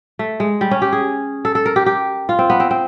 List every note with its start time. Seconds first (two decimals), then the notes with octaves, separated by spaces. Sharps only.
0.19 A3
0.40 G#3
0.61 G3
0.71 C#4
0.82 G4
0.93 G#4
1.45 A4
1.55 A4
1.66 A#4
1.76 G4
1.86 G4
2.29 F4
2.39 C4
2.50 B3
2.60 C4
2.71 C4